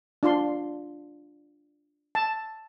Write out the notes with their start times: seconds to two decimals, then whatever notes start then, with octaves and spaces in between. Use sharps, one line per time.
0.23 D4 F4 C6
2.15 A5